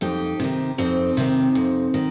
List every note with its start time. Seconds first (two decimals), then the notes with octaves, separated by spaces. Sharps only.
0.01 F2 D#4 G4
0.40 C3 D#3
0.78 F2 C4 D#4
1.17 C3 D#3
1.55 F2
1.94 D#3